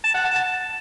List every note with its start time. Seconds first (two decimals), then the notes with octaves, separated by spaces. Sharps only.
0.04 A5
0.14 F#5
0.25 A5
0.36 A5